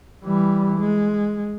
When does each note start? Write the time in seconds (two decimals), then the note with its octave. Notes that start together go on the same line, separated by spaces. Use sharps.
0.24 E3 G3
0.80 G#3